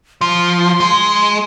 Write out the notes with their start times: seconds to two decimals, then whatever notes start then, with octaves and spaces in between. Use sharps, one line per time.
0.21 F3 C6
0.80 G#3